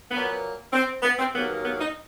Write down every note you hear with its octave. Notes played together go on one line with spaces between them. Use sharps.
A#2 F#3 A#3 B3
C4
B3
C4
D#2 C#3 F#3 A#3 B3
B3
D#4